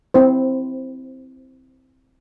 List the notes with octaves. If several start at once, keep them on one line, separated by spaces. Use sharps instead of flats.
C4 E4 C5